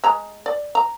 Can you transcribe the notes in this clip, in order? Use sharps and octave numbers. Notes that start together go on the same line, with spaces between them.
G#3 A#5
D5
A#5